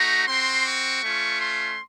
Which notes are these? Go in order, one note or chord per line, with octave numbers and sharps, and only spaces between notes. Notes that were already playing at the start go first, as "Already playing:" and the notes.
Already playing: A3 D#4 F#4 A#5
C4 F#4 C6
C#6
A3 C#4 F4
C6